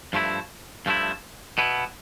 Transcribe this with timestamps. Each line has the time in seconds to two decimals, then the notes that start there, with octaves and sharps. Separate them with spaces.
0.13 G2 F3 A3 E4
0.86 G2 F3 A3 E4
1.58 B2 B3 E4